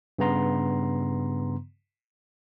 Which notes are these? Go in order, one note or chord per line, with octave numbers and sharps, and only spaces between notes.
G2 C#3 B3 A#5 C6